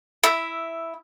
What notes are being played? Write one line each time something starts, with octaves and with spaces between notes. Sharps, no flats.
E4 E5